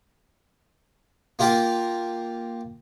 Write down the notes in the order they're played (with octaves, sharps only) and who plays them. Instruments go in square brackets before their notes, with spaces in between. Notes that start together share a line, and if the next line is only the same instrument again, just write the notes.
[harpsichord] A#3 F4 G4 A#4